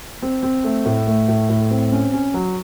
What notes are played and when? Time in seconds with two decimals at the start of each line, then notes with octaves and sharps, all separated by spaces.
0.22 C4
0.43 C4
0.64 A3
0.86 A2
1.07 A3
1.28 A2
1.49 A2
1.71 C4
1.92 C#4
2.13 C#4
2.34 F#3